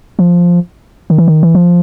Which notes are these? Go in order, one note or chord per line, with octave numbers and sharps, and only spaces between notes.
F3
D#3
E3
D#3
E3
F3